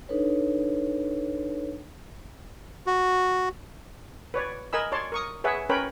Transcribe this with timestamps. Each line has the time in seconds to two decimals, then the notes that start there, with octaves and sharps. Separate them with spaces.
0.09 D4 D#4 A4 B4 C#5
2.87 F#4
4.34 B4 C#5 D5
4.73 A#4 D#5 G#5 B5 E6
4.92 C#5 D5 A5 C6
5.12 A#4 C#6 D#6
5.44 G#4 B4 C#5 E5 F#5
5.69 C#4 A#4 B4 C#5 G5 B5